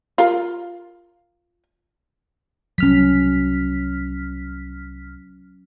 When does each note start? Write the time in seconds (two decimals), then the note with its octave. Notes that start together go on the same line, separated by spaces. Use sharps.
0.18 F4 A#4
2.78 C2 F#3 C#4 F6 B6